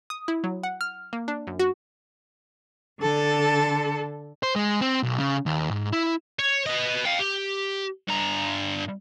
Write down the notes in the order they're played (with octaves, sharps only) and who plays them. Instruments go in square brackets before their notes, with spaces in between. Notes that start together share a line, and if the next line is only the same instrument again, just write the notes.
[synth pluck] D#6
E4
F#3
F#5
F6
A#3
D4
F#2
F#4
[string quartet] D3 A4
[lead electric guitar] C5
G#3
C4
B1
C#3
D#2
G#2
E4
[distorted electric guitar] C#5
B3 D#5
F5 G5
G4
G2 A#5